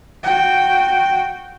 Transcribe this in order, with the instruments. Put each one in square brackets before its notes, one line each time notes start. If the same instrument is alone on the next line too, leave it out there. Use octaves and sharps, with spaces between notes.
[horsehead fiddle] F#4 G5